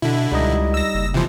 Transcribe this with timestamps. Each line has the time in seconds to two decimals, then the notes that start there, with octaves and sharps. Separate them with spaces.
0.02 B2 D3 E4
0.32 C#2 G3 D#4 D#5
0.74 E6 A#6
0.94 F#1
1.14 C3 E3 F3